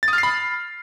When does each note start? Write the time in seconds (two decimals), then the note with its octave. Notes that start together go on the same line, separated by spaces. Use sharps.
0.03 A6
0.08 D#6
0.13 F6
0.18 C7
0.23 B5